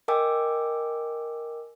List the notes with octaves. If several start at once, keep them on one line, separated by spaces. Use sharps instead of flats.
A#4 D#5 G5 G#5 D6 E6